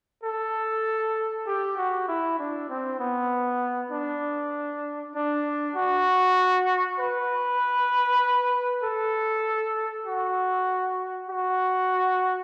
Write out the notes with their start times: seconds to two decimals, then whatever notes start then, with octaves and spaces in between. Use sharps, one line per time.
0.23 A4
1.47 G4
1.77 F#4
2.08 E4
2.39 D4
2.69 C4
3.00 B3
3.91 D4
5.15 D4
5.76 F#4
6.99 B4
8.83 A4
10.06 F#4
11.29 F#4